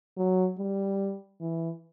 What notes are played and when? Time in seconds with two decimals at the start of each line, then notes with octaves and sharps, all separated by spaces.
0.17 F#3
0.58 G3
1.41 E3